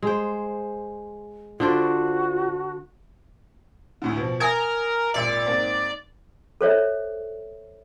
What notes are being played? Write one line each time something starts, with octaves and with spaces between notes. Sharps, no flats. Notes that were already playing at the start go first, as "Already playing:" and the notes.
G#3 C5
D3 D4 F4 F#4 C5
D2 A2 D3
B2 F3
A#4 G#5 D#6 G#6
G#1 A#2 D5 E5
G#2 A#3 C4
A4 C5 C#5 E5